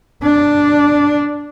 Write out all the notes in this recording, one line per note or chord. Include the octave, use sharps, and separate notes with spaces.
D4